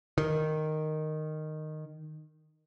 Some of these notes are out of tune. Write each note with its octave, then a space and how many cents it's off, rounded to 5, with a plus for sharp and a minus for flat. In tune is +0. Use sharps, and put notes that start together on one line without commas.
D#3 -10